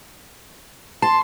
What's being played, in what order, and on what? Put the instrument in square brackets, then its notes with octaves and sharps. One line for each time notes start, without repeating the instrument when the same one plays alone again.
[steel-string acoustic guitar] A5 [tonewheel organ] C6